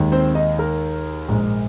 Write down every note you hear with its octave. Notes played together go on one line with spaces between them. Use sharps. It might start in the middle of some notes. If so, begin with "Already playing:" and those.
Already playing: D#2 D#3 G#3
C4 C5
D#4 D#5
A#4
A#1 G#2 G#3